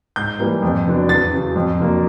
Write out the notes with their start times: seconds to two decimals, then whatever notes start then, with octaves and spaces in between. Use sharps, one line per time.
0.16 G#2 G6
0.39 E3 G3 A#3
0.62 F2
0.86 D3 F#3 B3 D4
1.09 E2 A6
1.32 C#3 F#3
1.56 F2
1.79 D3 F#3 A#3